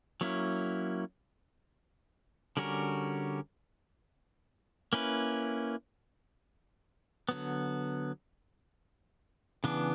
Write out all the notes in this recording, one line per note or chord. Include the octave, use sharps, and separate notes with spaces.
F#3 A#3 C#4 E4
D3 G3 C#4 F#4 A#4
A#3 C#4 E4 B4
D3 F#3 B3
C#3 E3 B3 D4